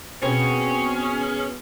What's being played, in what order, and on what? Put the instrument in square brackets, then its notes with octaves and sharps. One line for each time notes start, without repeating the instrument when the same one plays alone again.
[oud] B2 [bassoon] C4 [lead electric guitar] C#4 [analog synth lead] G#4